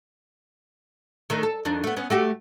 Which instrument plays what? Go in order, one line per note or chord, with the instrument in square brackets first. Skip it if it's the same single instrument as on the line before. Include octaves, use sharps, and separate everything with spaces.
[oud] D#3 A3 D4
A4
F2 D#3 D4
A3 B3
B3 C#4
A3 F#4 G4